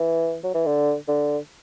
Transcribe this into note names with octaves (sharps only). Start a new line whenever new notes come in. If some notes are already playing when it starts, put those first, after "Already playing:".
Already playing: E3
F#3
E3
D3
D3